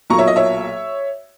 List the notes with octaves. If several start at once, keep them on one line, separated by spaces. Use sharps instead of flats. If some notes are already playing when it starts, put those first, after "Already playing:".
B1 A#2 F#3 A#3 A#5 C#6
C#5 E5
D#5
C#5 E5